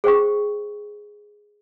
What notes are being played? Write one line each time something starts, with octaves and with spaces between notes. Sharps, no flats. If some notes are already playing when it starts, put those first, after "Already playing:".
G#4 C5 G5 C#6